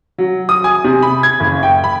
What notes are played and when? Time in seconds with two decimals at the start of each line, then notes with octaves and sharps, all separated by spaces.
0.18 F#3
0.49 D#6
0.64 G#5
0.84 C3
1.02 B5
1.23 G#6
1.40 F#1
1.63 G5
1.84 B5